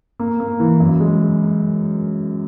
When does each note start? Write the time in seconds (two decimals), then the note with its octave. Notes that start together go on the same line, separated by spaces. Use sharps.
0.20 A#3
0.40 A#3
0.60 E3
0.80 F#2
1.00 G#3